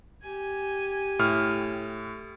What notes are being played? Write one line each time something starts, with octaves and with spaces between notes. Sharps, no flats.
G4 G#5
A2 F6